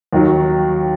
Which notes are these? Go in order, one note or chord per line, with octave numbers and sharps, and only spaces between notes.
D#2 D#3 F#3